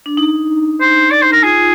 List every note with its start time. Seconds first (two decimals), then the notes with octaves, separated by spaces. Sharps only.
0.06 D4
0.17 D#4
0.81 C5
1.11 D5
1.22 C5
1.32 A#4
1.43 F4 G#4